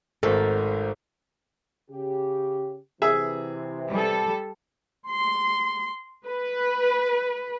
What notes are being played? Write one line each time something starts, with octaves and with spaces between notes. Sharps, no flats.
G#1 G#2 A3 A4 A#4 C5 F#5
C#3 G4
C3 E3 G#4 E5
G3 A4
C6
B4